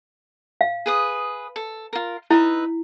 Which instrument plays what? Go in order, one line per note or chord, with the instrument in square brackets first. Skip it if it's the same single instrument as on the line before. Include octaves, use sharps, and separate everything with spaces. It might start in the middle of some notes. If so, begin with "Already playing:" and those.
[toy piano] F5
[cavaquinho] G#4 B4 D#6
A4
F4 A#4
[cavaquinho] D#4 B4 E5 [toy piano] E4